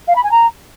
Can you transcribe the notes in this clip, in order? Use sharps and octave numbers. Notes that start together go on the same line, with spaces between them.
F5
B5
G#5
A#5